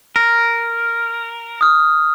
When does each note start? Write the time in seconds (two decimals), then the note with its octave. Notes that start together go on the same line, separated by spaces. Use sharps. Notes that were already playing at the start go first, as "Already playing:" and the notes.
0.16 A#4
1.61 D#6 F6